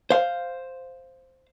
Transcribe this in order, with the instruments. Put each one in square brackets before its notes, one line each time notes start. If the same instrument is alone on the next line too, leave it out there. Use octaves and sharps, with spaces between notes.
[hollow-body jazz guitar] C5 F5